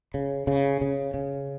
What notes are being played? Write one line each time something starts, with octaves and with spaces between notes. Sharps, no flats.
C#3
C#3
C#3
C#3